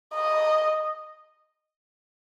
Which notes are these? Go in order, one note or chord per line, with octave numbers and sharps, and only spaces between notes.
D#5